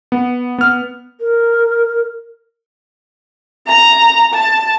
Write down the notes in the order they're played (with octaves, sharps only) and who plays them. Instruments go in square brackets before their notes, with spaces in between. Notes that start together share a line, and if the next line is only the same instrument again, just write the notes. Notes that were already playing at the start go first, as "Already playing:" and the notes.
[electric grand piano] B3
B3 F6
[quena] A#4
[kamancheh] A#5
A5